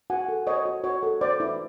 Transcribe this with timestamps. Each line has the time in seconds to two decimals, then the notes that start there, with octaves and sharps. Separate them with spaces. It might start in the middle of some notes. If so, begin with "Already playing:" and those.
0.10 F#4 F#5 G#5
0.28 A4
0.47 C5 C#5 D#5
0.65 F#4
0.84 F#4 C#5
1.03 A4
1.21 C5 D5
1.40 E4